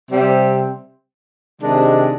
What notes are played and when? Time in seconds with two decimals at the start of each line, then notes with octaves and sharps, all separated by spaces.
0.10 C3 G3 C4
1.61 C3 D#3 G#3 D4